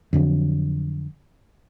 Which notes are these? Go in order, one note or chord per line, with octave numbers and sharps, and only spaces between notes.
F2 D3 F#3